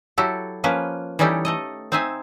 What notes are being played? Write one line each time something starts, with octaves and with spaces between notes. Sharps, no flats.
F#3 E4 F#4 G4 A4
F3 A#3 C#4 B4
E3 G3 C#4 D#4 G4 A4
A3 A4 D#5
C4 D#4 C5 E5 G#5